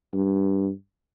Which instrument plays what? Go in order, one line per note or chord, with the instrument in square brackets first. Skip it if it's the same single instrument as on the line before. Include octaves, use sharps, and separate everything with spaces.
[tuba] G2